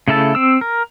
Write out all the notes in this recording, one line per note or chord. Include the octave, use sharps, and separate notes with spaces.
C#3 A3 E4 A4 A5
C4 E6
A#4